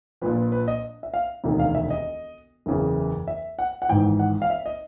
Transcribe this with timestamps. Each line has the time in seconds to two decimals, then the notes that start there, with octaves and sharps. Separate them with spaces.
0.22 A#1 A#2 F3 B4
0.37 B4
0.52 B4
0.68 D#5
1.03 E5
1.14 F5
1.44 E1 D2 C3 D#3
1.59 F5
1.75 E5
1.90 D#5
2.66 F#1 E2 C#3 E3
3.28 E5
3.59 F#5
3.82 F#5
3.89 G#1 G#2 E3 G5
4.19 F#5
4.42 F5
4.50 E5
4.66 D#5